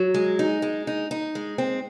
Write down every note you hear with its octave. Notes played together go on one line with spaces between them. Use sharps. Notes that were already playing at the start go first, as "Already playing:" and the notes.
Already playing: F#3
G#3
D#4
G#3
D#4
D#4
G#3
C4